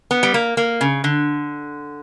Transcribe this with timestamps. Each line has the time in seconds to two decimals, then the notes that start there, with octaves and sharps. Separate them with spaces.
0.11 B3
0.23 G3
0.34 A#3
0.57 A#3
0.81 C#3
1.04 D3